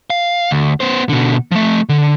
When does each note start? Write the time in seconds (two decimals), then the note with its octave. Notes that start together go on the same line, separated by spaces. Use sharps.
0.10 F5
0.51 D2
0.80 B3 C5
1.09 B2 D3
1.52 F3 A3
1.89 D3